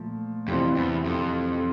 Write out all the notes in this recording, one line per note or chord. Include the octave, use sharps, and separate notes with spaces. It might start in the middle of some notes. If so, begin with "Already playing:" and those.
Already playing: A#2 F3 A3
F2 C3 E3 G3 C4
E2
F2